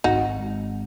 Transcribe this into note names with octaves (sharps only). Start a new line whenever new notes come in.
G#1 D#4 F#4
G#2